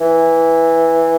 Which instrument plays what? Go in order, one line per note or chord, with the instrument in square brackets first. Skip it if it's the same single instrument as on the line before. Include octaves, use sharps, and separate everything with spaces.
[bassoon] E3